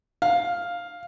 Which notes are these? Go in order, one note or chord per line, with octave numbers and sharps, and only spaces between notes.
F5